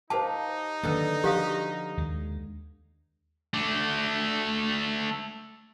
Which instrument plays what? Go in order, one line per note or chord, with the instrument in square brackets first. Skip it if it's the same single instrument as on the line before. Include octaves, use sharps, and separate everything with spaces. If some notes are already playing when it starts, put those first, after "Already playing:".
[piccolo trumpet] D#4 [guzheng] G4 F5 [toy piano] C5 A5
[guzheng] D3 B3 A4 [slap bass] D#3 F#3 A#3
[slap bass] F3 [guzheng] F#4 [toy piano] G4 F5 D#6
[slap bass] D#2 D#3 G#3
[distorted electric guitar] A3 D4